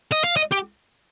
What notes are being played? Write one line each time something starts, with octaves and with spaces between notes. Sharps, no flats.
D#5
F5
D#5
G4